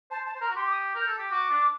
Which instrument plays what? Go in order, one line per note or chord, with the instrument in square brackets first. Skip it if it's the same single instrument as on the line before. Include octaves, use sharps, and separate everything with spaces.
[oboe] C5 [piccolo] A5
[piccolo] A5
[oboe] C5
[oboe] A#4 [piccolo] A#5
[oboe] F#4
[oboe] G4 [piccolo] C6
[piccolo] D6
D#6
[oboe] A#4
[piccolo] G6
[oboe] A4
G4
[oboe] F#4 [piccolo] D6
[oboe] D4